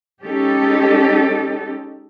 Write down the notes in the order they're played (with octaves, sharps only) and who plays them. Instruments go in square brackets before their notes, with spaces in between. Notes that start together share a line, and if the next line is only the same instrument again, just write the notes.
[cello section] G#3 C#4 D#4 G4 A4